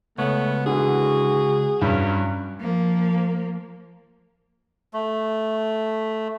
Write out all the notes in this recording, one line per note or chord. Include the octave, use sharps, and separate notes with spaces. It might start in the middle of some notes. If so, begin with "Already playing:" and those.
C#2 A3 B3 C#5
D3 E3 F#4 G#4
G2 F#3 G3 C#4
F3 A#3
A3